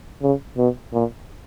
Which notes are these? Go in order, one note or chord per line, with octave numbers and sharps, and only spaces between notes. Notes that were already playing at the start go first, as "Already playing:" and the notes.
C#3
B2
A#2